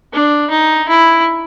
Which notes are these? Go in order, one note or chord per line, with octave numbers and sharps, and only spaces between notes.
D4
D#4
E4